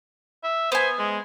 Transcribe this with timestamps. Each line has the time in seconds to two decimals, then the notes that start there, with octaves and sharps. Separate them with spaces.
0.44 E5
0.72 B3 C5 G#5
0.99 G#3